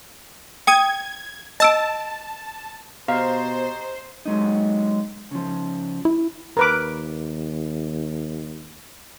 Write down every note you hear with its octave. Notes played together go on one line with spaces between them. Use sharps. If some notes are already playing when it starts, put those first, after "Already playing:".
G5 D#6 G#6 D#7
D#5 A5 E6 D7
B2 G4 C5 D#5 F5 A#5
F#3 G#3 D#4
C#3 F3
E4
D#2 A#4 B4 D6